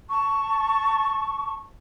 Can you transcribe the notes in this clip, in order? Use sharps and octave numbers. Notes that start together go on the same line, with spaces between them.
A5 C#6